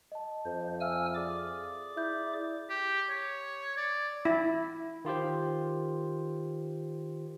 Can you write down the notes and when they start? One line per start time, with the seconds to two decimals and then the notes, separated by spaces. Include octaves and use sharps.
0.12 D#5 A5
0.46 F2 C5
0.81 E5 F5 G#5 E6 F6
1.15 G#4 D5 D6
1.97 E4 G6
2.70 G4
3.10 C#5
3.77 D5
4.25 E4
5.05 D#3 F4 G4 C5